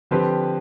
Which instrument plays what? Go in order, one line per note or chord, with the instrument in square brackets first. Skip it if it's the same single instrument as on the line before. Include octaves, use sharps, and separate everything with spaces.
[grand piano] D3 F3 C4 G4 B4